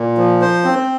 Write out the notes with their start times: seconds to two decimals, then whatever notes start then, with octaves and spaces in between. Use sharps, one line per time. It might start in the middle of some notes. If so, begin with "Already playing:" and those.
Already playing: A#2
0.17 F3
0.41 C5
0.64 C4